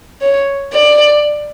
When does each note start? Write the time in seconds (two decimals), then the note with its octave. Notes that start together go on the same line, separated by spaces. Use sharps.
0.21 C#5
0.73 D5